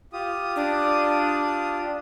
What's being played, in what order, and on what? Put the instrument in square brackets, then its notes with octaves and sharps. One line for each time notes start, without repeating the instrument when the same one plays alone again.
[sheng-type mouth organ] F4 G4 D#6
[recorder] D4